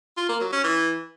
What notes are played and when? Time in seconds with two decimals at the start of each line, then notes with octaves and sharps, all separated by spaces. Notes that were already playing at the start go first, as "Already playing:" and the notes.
0.17 F4
0.29 A#3
0.41 F#3
0.52 C#4
0.64 E3